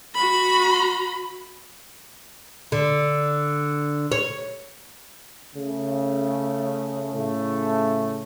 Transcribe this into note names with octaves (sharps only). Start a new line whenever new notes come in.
F#4 B5
D3
C#5
C#3 A3
A2 C#3 A3